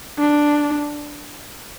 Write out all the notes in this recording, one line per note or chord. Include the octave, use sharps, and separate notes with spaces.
D4